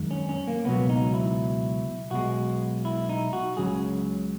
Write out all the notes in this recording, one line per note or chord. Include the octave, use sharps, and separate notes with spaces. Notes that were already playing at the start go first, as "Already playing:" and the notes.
Already playing: F#2 D#3 G#3
C#4
C#4
A#3
C#2 B2 F#3 B3
D#4
E4
B1 B2 G#3 F#4
E4
D#4
F#4
C#2 C#3 F#3 G#4